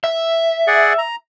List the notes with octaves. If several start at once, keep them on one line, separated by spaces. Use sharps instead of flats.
E5
G#4 D5 F#5
A#5